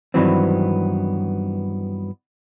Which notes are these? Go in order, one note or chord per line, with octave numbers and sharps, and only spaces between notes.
G2 D#3 E3 F#3 B3 C4